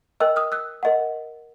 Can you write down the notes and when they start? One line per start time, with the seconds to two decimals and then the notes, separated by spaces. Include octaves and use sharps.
0.20 A#4 D#5 G5 E6 F#6
0.36 D#6 F6
0.52 E6 F#6
0.83 A#4 D#5 F#5